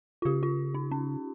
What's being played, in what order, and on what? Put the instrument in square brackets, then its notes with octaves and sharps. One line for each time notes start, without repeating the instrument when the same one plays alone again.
[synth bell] F4
[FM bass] C#3 [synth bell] G4
[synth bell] F4
D#4
C#4